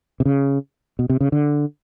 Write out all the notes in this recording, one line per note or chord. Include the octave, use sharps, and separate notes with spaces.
C3
C#3
B2
C3
C#3
D3